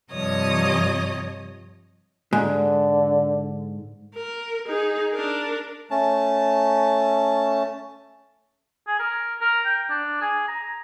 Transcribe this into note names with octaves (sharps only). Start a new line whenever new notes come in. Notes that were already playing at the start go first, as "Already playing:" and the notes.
G2 C3 F3 C#5 D#5 D#6
G#2 D3
A#4
D#4 G#4
D4 A#4
A3 C#4 A5
G#4
A#4
A#4
G5
D4
G#4
A#5